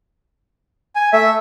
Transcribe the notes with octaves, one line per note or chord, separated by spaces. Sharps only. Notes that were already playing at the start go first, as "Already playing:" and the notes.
G#5
A3 E5